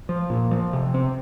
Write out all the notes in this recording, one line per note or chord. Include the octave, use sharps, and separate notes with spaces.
F3
A#2
F3
C3
C4